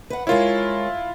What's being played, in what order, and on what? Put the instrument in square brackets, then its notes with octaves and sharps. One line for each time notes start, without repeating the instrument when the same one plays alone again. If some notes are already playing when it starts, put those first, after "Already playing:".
[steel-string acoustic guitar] B4 F#5
[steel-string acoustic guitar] G#3 A#4 C#5 [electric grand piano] E4 F4